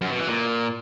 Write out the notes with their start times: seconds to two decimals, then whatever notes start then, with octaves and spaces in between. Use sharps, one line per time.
0.01 F#2
0.10 B2
0.19 E3
0.28 A#2